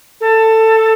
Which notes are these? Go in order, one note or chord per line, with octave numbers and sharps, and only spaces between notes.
A4